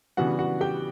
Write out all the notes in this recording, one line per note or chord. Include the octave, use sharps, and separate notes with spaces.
C#3 E3 G3 B3 D4 F#4 F#5
F#4 F#5
G4 G5